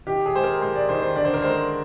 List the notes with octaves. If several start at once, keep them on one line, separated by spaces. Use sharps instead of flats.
D#3 G4
G#4
G#3 C5
A#4
G#3 C5
D5
D#3 C5
C5
D3 D5
C5
A#4
G#3 C5